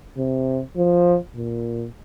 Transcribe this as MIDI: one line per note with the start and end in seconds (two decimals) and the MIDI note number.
0.17 0.61 48
0.77 1.17 53
1.36 1.86 46